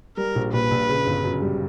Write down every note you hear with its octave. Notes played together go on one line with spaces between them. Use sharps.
G3 A#4
A#1
A#2 B4
A#1
C#3
G1
F#2
G3